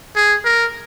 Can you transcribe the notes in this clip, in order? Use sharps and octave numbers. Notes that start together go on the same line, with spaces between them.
G#4
A#4